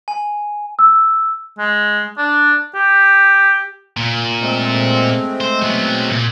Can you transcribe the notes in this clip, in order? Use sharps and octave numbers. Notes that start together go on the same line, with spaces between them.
G#5
E6
G#3
D4
G4
A#2
G#3 A3 C4
C5
F#3 B3
A#2